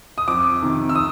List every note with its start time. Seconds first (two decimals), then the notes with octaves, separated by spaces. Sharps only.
0.18 D#6
0.27 F2 D6
0.62 C3 D#3
0.89 E6
0.95 D#6